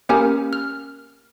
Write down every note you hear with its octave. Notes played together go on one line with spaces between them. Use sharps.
A#3 C#4 G4 A#4 G#5 F6
F6